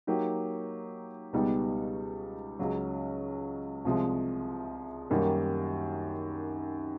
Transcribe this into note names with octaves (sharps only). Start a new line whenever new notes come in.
F#3 A#3 D#4 G4
C#2 B2 G3 B3 D#4
C#2 C#3 F#3
C2 C3 F3 G#3
F#2 D#3 G3 A#3